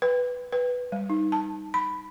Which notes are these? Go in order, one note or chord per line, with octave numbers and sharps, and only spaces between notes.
B4
B4
G3
D#4
A5
B5